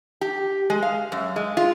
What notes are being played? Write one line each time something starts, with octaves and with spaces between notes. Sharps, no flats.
G4
G#3
F5
F#2
G#3
F4